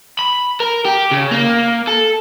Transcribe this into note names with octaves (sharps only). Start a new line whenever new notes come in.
B5
A#4
G4
C#3
A#3
A4